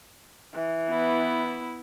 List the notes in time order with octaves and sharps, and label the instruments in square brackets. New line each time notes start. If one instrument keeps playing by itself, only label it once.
[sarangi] E3
[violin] B3 E4